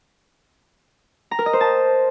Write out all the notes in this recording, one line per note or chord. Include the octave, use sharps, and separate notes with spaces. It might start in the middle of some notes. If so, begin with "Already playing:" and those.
A#5
A#4
D#5
C5
A5